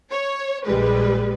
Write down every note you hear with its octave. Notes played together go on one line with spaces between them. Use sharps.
C#5
A#1 G3 G#3 B4